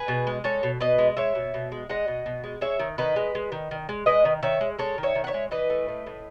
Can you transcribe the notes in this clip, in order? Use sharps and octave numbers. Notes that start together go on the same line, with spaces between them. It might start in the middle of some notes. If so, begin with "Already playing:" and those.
Already playing: G#4 B4
B2
G#3
G#3 A4 C#5
B2
B2 B4 D#5
G#3
G#3 C#5 E5
B2
B2
G#3
G#3 D#5 F#5
B2
B2
G#3
G#3 C#5 E5
D#3
D#3 B4 D#5
G#3
G#3
D#3
D#3
G#3
G#3 B4 D#5
D#3
D#3 C#5 E5
G#3
G#3 A4 C#5
D#3
C#5 E5
D#3
F#5
C#5 E5
G#3
E3 B4 D#5
A3
A2
A2